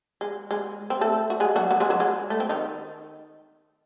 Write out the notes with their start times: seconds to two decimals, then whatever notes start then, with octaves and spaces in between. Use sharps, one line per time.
0.21 G#3
0.51 G#3
0.90 C4
1.01 A3 A4
1.30 F#4
1.40 G#3 G#4
1.56 F#3 F#4
1.71 F#3 F#4
1.80 G#3 G#4
1.90 F#3 F#4
2.00 G#3
2.30 A3
2.40 C4
2.49 D#3 D#4